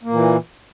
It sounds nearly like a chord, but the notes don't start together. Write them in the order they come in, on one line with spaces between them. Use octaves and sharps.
A#3 A#2 E3